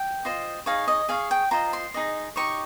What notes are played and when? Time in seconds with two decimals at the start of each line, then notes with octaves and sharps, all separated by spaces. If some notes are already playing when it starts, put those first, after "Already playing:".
Already playing: G5
0.25 F4 C5 D#5
0.66 D#4 G#4 C#5 F5
0.88 D#5
1.09 G#4 C#5 F5
1.31 G5
1.51 F4 C5 D#5 A#5
1.73 C6
1.94 D#4 G#4 D#5
2.36 D#4 G4 C#5 C#6